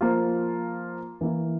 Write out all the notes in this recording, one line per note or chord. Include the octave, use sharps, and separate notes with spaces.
F3 A#3 F4
E3 A#3 E4